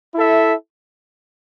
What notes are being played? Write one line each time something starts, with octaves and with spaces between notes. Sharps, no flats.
E4 A4 E5